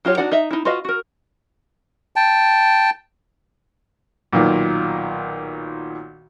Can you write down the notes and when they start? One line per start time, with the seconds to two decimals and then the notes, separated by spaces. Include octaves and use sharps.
0.05 F#3 F4 G4 C#5
0.17 D4 D#4 F#4 D5 F#5
0.32 D#4 D#5 E5
0.51 D#4 E4
0.65 F4 F#4 B4 D#5 F5
0.85 F#4 A#4
2.16 G5 A5
4.33 B1 A#2 D#3